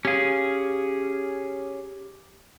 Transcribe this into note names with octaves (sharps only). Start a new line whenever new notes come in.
C#4 G4 G#4 F5